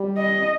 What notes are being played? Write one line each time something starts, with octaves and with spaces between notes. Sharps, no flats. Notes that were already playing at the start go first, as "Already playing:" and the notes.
Already playing: G3
D#5